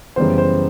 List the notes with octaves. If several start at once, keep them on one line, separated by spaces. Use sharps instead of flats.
F#2 C#3 E3 G3 B3 C5
C5